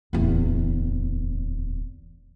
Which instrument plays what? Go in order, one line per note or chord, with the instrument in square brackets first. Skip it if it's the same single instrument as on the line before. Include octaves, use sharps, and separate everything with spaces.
[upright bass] D1 E2